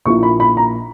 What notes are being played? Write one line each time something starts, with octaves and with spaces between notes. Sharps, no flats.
A#1 A#2 A#3 E4 C#6
B5
B5
A#5